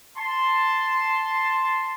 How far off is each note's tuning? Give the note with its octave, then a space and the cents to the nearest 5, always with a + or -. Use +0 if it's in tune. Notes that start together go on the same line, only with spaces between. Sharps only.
A5 +0 C6 +0